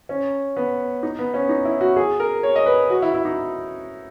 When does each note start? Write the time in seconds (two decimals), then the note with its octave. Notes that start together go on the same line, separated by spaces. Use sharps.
0.09 C#4
0.56 B3
1.03 D#4
1.19 B3
1.34 C#4
1.49 D#4
1.65 E4
1.81 F#4
1.96 G#4
2.20 A#4
2.43 C#5
2.56 D#5
2.66 B4
2.90 F#4
3.02 E4
3.14 E4
3.25 D#4